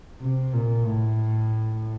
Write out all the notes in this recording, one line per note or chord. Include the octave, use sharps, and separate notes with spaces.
C3
A#2
A2